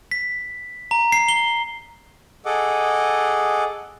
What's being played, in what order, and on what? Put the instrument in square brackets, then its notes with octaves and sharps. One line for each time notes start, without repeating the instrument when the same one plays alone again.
[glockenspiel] B6
A#5
C7
G7
[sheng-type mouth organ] G#4 A4 D#5 F#5 D6